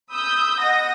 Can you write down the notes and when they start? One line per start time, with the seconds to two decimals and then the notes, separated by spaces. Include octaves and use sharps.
0.11 B5 D#6 E6 G6
0.60 D#5 F#5 D#6 A#6